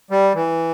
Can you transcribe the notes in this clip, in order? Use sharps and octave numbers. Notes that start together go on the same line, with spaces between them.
G3
E3